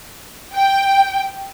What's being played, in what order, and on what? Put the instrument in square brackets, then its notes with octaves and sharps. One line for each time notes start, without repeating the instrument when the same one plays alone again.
[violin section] G5